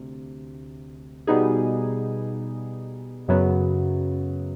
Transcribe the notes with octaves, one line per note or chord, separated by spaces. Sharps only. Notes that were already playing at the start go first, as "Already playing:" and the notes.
Already playing: D2 C3
B2 G3 B3 D#4 G#4
F#2 C#3 F#3 B3